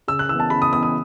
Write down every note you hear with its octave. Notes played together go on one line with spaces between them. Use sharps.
C#3 E6
F#6
E3 E6
B3
A5
C#3 B5
D#6
E3 B3 D#6
D#6